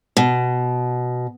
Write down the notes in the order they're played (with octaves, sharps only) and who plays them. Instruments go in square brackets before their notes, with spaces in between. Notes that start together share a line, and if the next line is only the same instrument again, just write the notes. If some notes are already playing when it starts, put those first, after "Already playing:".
[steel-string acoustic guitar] B2